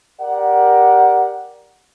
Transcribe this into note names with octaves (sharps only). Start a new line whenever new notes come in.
G4 A#4 D5 F#5